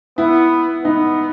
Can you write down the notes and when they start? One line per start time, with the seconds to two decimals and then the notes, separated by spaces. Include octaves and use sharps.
0.18 B3 E4
0.85 B3 D#4